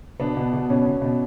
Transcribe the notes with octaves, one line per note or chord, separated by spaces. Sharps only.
B2 B3 D4
B2
B2
B2 C#4
B2
B2